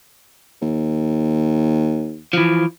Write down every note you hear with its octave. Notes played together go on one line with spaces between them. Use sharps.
D#2
E3 F3